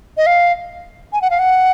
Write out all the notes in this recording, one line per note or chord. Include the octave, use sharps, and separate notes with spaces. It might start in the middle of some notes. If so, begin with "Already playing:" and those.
D#5
F5
G#5
F#5
F5
F#5